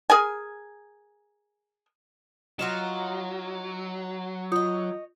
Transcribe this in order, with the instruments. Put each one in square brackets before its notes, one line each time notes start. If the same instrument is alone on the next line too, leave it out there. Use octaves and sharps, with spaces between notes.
[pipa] G#4 A#4 G#5
[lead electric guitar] F#3 [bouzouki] D#4 F4 F#4 [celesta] E7
[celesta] F4 D#6 G6 [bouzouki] C#5 D#5